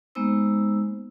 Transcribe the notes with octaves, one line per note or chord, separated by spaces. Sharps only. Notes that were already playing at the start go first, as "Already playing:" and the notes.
G#3 A#3 B3 D#4 C5 E6